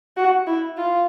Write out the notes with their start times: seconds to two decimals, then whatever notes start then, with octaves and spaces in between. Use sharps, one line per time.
0.17 F#4
0.47 E4
0.77 F4